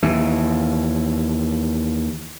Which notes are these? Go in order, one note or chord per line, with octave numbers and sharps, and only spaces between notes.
D#2 E3